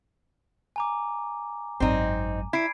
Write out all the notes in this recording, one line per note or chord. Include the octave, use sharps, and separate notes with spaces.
G#5 A#5 D6
G#1 F#2 C4 D#4
E4 G#6 C7 D7